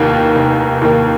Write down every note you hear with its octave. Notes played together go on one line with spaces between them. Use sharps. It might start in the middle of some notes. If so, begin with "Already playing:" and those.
Already playing: F1 D#2 D#3 A#3
F1
D#2 D#3 A#3